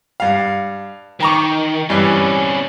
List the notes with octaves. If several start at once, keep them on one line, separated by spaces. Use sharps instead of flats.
G2 F5
D#3 G5 A#5 C#6
G2 C3 E3 C#4